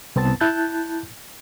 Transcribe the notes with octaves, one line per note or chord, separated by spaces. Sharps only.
C2 B3 C4 A5 A6
E4 A5 F#6 G6 A6